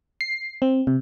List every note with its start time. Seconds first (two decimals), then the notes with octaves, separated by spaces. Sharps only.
0.21 C7
0.62 C4
0.87 C3